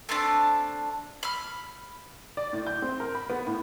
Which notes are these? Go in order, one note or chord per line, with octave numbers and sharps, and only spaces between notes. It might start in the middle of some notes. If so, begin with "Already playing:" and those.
A3 C4 D4 A5
B5 F6
D5
A2
G6
C4
A#4
B5
B3
A2